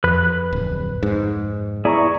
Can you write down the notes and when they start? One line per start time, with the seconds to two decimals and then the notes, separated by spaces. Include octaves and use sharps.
0.04 F2 B4 B5 F#6
0.53 D1
1.03 G#2
1.85 B3 E4 G#4 D5 A#5 C#6